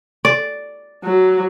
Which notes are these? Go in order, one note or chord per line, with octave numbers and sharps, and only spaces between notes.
D5
F#3